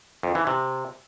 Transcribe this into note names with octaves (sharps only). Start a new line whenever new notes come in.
F2
E3
C3